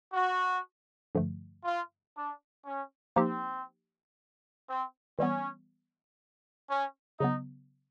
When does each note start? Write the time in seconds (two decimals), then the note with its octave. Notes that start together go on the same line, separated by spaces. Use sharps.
0.13 F#4
1.15 G2 D3 F3 A3
1.64 F4
2.16 D4
2.65 C#4
3.16 F3 A#3 C4 D#4 G4
4.67 C4
5.18 E3 G3 B3 C#4
6.69 C#4
7.19 C#3 F#3 B3 D#4